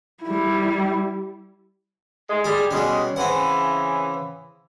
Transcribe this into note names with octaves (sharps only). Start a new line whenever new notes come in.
G3 E4
G#3
G3 G#4
B2 G3 G#3 C#4
C#3 E3 C4 F#5